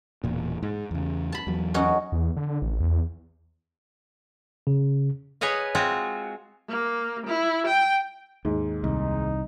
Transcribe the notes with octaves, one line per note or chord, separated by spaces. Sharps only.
E1 A#2
G#2
E2 C#3
A5 B5
E2 F#3
C#4 D#4 F#4
E2
D3
A1
E2
C#3
G#4 B4 C#5 D#5 F5
G#3 C4 F4 F#4
A#3
E4
G5
D#2 G#2
C2 D#4